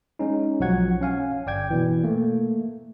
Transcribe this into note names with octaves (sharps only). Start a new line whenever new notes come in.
G#3 C#4 D#4
B1 F3 F#3 F#4 F#5 G#6
C#4 F5 G#5
G1 D5 G5 G#6
B2 E3
A3 A#3